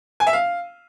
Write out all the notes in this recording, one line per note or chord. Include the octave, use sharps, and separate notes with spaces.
G#5
E5
F5